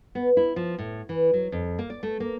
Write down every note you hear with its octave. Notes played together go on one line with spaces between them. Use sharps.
B3
E4
F3
A2
E3
F#3
F2
A#3
D5
A3
A#3